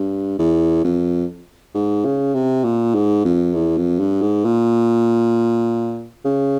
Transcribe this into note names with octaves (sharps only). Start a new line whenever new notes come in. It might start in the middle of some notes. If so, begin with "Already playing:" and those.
Already playing: G2
E2
F2
G#2
C#3
C3
A#2
G#2
F2
E2
F2
G2
G#2
A#2
C#3